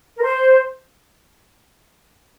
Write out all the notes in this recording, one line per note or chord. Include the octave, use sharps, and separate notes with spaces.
A#4
C5